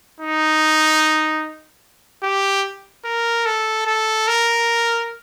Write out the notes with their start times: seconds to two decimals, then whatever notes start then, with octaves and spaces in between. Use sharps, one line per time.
0.21 D#4
2.23 G4
3.05 A#4
3.46 A4
3.86 A4
4.28 A#4